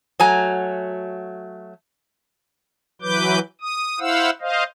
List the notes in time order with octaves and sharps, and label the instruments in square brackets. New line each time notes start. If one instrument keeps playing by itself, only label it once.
[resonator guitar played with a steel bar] F#3 A3 G#5 A#5
[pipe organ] E3 F#3 B4 D6 G6
D#6
E4 C5 F5 F#5 E6
C5 D#5 F5